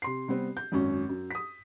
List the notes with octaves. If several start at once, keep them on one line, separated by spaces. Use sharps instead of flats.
C3 C6 C7
C3 G3 B3 C4
G6
G#1 F#2 C#4
F#2
D#6 B6